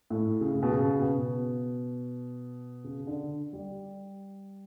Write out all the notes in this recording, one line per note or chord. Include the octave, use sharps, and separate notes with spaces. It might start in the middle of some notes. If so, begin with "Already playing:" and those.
A2
C#3
B2
C#3
B2
C#3
D3
G3